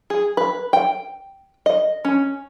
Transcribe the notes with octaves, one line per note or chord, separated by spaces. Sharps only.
G#4
B4
G5
D#5
C#4